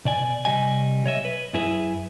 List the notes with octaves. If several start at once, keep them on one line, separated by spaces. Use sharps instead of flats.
B2 D5 G#5
C3 G3 D#5 G#5
B1 C#5 D#5 E5
B4
F#2 E4 G#4 B4 E5